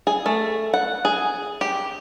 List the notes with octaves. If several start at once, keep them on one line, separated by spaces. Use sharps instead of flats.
G#4
A3
F#5
G#4
G4